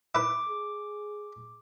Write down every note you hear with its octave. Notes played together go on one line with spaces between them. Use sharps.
E4 B4 D6
G#4